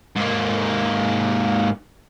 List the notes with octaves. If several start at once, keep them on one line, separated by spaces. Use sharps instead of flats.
G#2 A#3